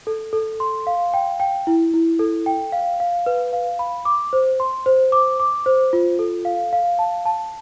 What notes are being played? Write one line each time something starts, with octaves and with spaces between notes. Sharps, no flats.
A4
A4
C6
F5
G5
G5
E4
E4
A4
G5
F5
F5
B4
F5
B5
D6
C5
C6
C5
D6
D6
C5
F4
A4
F5
F5
A5
A5